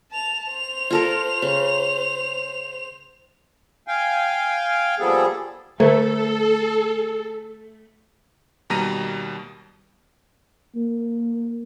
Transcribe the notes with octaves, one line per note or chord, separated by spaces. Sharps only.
A5 F7
C5 F7
F4 A4 A#4
C#3
F5 G5 G#5
A#2 F3 G3 B3 G#4 A4
D3 A3 A4 C5
D#2 B2 G3 A#5 A#6 D#7
A#3